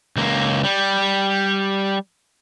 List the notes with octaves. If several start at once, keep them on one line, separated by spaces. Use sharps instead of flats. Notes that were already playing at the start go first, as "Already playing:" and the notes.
C#2 A#3
G3